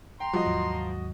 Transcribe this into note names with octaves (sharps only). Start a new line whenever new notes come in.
G5 A#5 C6
F3 G3 F#4 D#5
D#2 G#2 F#3